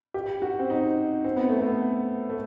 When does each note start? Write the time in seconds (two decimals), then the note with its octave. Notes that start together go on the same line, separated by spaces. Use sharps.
0.14 G4
0.42 F#4
0.59 C4
0.70 D#4
1.24 C4
1.36 B3
1.49 A3
1.60 B3
2.30 A3